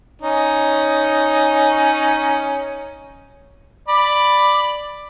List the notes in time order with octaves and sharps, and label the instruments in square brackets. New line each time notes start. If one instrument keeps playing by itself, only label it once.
[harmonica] C#4 D#4
D5 B5